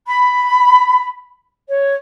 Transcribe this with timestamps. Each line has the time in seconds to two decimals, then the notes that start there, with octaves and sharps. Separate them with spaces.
0.06 B5
1.67 C#5